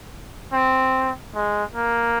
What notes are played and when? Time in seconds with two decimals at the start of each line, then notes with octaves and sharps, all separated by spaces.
0.53 C4
1.35 G#3
1.76 A#3